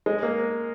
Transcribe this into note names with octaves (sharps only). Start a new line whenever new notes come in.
G#3
A#3